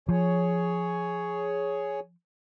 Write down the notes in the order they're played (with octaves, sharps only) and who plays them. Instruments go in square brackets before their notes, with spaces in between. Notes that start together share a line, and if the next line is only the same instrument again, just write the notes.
[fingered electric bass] F3 [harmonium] G#4 C#5